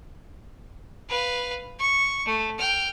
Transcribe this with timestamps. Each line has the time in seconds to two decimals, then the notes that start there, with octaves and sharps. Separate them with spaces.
1.09 B4 F5
1.79 C#6
2.26 A3
2.59 G5 F6